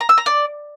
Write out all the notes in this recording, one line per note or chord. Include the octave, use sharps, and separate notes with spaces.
A#5
E6
A#5
D5